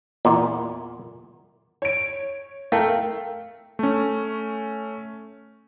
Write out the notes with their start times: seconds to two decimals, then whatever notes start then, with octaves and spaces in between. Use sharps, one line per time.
0.25 E2 A#2
1.82 C#5 D7
2.72 A3 A#4 F5 G5
3.79 A3 C#4